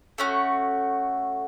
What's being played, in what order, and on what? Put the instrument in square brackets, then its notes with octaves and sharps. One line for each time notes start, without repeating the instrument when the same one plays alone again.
[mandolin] A3 C#4 F#4